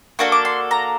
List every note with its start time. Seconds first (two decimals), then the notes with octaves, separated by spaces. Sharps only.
0.19 A#3 D4 F#4 A4 C#6
0.32 D6
0.45 C6
0.71 A#5